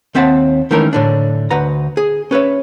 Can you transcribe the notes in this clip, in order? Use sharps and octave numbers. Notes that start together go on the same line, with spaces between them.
D#2 C4 E5 F#5 A5
D#3 E3 G#3 A3 C#4 A#4
A2 D3 D4
D2 B4 F#5 A#5
G#4
C#4 B4 C#5 E5